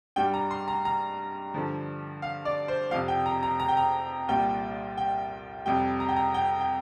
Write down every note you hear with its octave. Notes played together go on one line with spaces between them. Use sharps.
G2 G3 G5
A#5
C6
A#5
A#5
G2 D3 F3
F5
D5
C5
F2 C3 F3 F5
G5
A#5
A#5
A#5
G5
A#5
C2 A#2 G3 G5
G5
F2 C3 G3 G5
A#5
G5
A#5
G5
G5